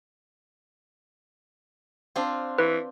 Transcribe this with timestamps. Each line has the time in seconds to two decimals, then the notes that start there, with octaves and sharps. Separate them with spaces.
2.16 C4 D4 F4
2.58 E3 B4